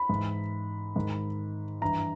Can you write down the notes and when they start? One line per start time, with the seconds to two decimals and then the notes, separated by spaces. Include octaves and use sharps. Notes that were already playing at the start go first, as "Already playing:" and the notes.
Already playing: B5
0.09 G#2 E3
0.96 G#2 D#3
1.81 G2 E3 A#5